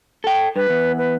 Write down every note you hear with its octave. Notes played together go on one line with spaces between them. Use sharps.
A4 G5
G2 B4
E2
B4